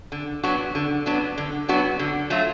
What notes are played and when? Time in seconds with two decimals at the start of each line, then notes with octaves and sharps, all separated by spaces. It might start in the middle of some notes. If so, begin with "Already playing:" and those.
0.12 D3
0.43 F#3 B3 D4 F#4
0.75 D3
1.06 F#3 B3 D4 F#4
1.38 D3
1.68 F#3 B3 D4 F#4
1.99 D3
2.30 F#3 A3 F4